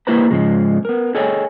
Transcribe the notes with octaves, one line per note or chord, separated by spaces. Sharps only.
A#3 E4 G4 B4 C5 A#5
G#2 C#3 F3 G#3
B3 A#4
G#4 A4 C#5 D#5 G5 G#5